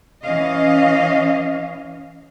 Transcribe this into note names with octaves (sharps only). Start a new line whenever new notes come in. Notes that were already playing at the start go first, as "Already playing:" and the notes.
E3 C#4 D#5 F5